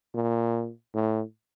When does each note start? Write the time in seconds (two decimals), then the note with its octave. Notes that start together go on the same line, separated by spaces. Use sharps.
0.15 A#2
0.95 A2